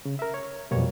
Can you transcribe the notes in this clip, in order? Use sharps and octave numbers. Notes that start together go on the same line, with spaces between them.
C#3
A#4 E5
C#5
F2 B2 G3 A#3 C#5